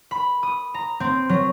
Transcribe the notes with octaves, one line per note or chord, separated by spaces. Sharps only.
B5
D#6
A#5
C4
F#3